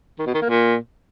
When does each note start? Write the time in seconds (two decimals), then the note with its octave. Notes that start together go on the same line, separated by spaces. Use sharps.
0.19 D#3
0.27 B2
0.34 D#3
0.42 A#3
0.49 A#2